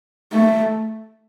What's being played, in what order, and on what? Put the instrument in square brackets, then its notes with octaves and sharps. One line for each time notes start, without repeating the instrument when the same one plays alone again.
[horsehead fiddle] A3